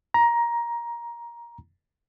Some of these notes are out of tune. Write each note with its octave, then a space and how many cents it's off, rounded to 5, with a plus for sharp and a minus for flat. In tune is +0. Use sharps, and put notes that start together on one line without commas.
A#5 +15